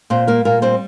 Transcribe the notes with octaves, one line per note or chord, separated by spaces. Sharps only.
A#2 C4 C5
G3 A#3 A#4
A#2 A#3 A#4
G3 C4 C5